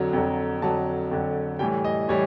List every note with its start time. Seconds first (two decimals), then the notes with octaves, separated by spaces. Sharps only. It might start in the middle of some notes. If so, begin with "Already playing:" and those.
Already playing: F2 D3 F#3 A#5
0.13 F2 D3 F#3
0.62 F2 D3 F#3 A5
1.11 F2 D3 F#3
1.59 A2 E3 G3 G5
1.84 D#5
2.08 A2 E3 G3 C#5